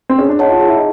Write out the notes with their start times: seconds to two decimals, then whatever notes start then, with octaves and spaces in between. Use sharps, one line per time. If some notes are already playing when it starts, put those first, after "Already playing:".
0.09 C4
0.19 C#4 G#4
0.29 D4
0.39 D#4 C#5 F#5 A5
0.49 F4
0.60 F4 G#4
0.68 E4
0.76 D#4